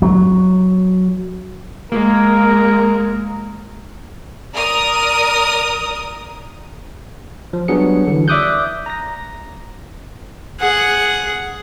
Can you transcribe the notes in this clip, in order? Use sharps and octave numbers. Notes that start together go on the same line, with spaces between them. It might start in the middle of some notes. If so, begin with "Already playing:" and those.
F#3
G#3 A#3 A#4
A#4 D5 D#6
F3
F#3 G3 B3 D4 G#4 C#7
D3 E3
D5 E5 D6 D#6 F#6 G6
A#5 A#6
G#4 F#5